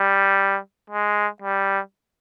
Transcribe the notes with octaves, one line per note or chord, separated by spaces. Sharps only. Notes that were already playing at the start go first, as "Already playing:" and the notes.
Already playing: G3
G#3
G3